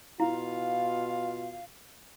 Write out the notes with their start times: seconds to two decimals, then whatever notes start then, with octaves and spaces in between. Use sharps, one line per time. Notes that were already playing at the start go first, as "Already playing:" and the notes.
0.20 B2 E4 F4 F5